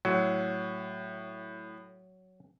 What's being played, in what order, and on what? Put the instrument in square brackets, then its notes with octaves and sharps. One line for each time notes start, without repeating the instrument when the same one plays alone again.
[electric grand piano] A2 [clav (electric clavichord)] F#3